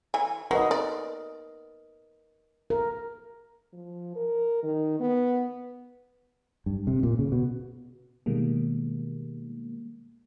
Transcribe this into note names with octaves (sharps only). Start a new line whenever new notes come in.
E3 G#5
F#3 A#4 B4 D#5
D5
A#4
F3
A#4
D#3
B3
G2
C3
A#2
C#3
B2
B2 D#3 G3 G#3 A#3